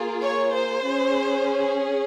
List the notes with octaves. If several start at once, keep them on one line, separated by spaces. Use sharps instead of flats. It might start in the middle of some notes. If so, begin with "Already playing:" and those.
Already playing: A#3 F4 G#4
C#5
C5
C#4 G#4